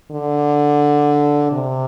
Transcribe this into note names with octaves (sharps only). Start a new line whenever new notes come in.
D3
C3